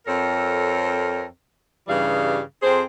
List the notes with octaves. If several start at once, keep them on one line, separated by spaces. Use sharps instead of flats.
F2 C4 A4 A#4 C#5
G2 C#3 E3 G3 G#4 F5
F2 C4 G#4 C5